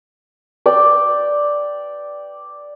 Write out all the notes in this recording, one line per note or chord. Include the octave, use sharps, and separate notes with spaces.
D5 G5 D6